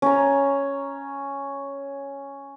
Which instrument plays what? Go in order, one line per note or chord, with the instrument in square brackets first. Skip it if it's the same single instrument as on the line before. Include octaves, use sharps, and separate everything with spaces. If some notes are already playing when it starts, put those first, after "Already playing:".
[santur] C#4 A#5